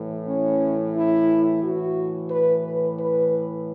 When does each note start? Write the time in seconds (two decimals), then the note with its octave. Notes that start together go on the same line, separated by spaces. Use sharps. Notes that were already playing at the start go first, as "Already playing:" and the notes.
Already playing: A2 E3
0.27 C#4
0.95 E4
1.62 A2 E3 F#4
2.31 B4
2.63 B4
2.98 B4